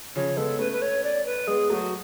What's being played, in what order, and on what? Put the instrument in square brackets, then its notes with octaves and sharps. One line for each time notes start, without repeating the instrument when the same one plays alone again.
[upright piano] C#3 F3 [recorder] C#5
[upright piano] G#3 B3 [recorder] A4
[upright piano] A3 C#4 [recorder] B4
[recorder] B4
C#5
D5
B4
[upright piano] G#3 B3 [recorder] G#4
[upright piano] F#3 A3 [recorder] F#4 G#4